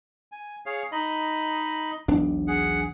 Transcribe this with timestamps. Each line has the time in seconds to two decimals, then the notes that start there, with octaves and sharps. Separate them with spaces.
0.32 G#5
0.66 G#4 C#5 F5
0.92 D#4 D#5 B5
2.08 E1 B1 D4
2.48 G#4 F#5